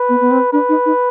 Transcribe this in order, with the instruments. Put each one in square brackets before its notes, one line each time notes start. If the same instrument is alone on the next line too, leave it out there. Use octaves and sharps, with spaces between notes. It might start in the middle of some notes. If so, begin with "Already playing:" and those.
Already playing: [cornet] B4
[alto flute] B3
B3
C4
[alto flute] D4 [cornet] B4
[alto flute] D#4
D#4